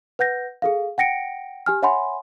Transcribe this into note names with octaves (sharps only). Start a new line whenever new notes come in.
B4 F#5 G6 A#6
G#4 A4 F5
F#5 G5 A#6 C#7 D7
G4 G#5 F6
C#5 E5 F#5 G#5 B5 C6